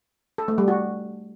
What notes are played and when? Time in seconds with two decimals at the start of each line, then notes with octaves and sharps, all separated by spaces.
0.38 A4
0.48 A3
0.58 G3
0.68 F#4